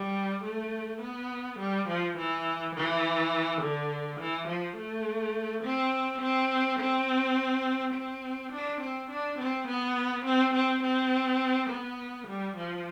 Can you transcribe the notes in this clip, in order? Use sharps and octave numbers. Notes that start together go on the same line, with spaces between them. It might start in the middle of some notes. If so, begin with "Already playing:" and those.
Already playing: G3
A3
B3
G3
F3
E3
E3
D3
E3
F3
A3
C4
C4
C4
C4
D4
C4
D4
C4
B3
C4
C4
C4
B3
G3
F3